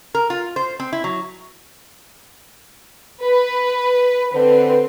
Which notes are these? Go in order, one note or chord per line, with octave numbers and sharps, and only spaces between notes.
A#4
F4
C5
C4
E4
F#3
B4
D3 C4 B4